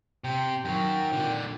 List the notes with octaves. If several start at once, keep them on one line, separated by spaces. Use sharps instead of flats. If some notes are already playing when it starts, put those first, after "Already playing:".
C3 G5
F#2 D#3 F#3 G5
A#2 D3